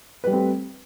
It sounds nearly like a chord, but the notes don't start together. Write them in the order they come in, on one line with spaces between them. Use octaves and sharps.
B4 G3 A3 C4 G4